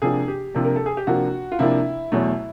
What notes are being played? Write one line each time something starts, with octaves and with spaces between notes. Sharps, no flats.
C3 F3 A#3 D4 G#4
G4
C3 F3 A#3 D4
A#4
A4
G#4
G4
C3 F3 A#3 D4 F#4
F4
C3 F3 A#3 D4 E4
E2 B2 F#3 A3 E4